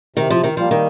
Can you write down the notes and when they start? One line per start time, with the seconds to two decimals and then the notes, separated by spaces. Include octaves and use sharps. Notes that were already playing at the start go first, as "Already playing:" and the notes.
0.16 C3 D#3
0.30 F3
0.43 D#3
0.57 F3 G3 A#3
0.71 D#3